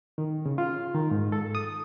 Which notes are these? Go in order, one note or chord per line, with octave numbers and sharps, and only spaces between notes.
D#3
C#3
F4
D#3
G#2
A4
D#6